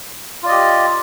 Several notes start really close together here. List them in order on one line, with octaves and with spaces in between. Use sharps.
F4 D5 D#5 G4